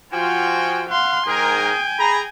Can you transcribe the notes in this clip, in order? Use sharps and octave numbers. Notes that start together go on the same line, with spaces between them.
F3 F4 F#4 G5 G#5
F5 F#5 C6
G#2 G#4 A#4 G5 G#5
G#4 A#5 B5